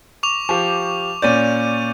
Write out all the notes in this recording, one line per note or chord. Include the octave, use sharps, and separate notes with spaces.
C#6 D6 F7
F3 G4 C#6
A#2 C#4 D5 G6 D#7